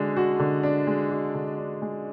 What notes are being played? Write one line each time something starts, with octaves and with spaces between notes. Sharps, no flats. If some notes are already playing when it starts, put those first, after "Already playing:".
Already playing: D3 G#3 D4 F#4
F#4
D3
D4
G#3
F#4
D3
D4
G#3